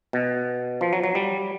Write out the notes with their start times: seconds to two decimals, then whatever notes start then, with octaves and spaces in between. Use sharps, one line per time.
0.13 B2
0.81 F3
0.93 F#3
1.04 F#3
1.15 G3